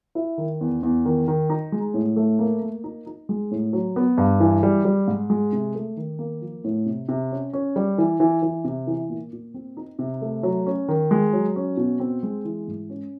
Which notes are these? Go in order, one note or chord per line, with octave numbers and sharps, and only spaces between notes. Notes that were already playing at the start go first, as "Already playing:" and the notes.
E4
D#3
E2
E2
D#3
D#3
D#4
G#3
A2
A3
A#3
A#3
D#4
D#4
G#3
A2
F#3
B3
G2
E3
G3
G3
G#2
G#3
C3
A3
D#3
A#3
F3
A2
C3
C3
C#4
C#4
G3
E3
E3
E3
C3
E3
A#2
A#2
C4
D#4
C3
A3
F#3
C#4
D#3
G#3
F#3
C#4
B2
C4
G#3
E3
G#2
C#4